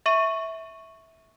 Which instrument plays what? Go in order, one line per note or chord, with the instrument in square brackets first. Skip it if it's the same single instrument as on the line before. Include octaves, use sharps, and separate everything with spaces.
[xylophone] E5 C#6 D#7